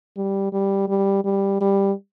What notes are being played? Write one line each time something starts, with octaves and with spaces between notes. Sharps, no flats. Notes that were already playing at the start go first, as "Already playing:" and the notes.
G3
G3
G3
G3
G3